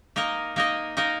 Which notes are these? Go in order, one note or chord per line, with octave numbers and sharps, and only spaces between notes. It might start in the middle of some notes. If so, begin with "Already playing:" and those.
A#3 D#4 A#4 D#5
A#3 D#4 A#4 D#5
A#3 D#4 A#4 D#5